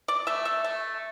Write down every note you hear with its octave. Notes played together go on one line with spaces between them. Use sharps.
D5
A3 E5
E5
A3